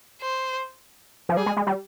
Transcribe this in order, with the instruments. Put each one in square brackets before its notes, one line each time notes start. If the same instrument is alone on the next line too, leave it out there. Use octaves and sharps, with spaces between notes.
[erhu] C5
[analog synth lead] F3
[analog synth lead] G3 [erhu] G#4
[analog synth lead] G#3
G#3
G3